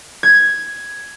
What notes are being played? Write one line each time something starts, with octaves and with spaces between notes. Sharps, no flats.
G#6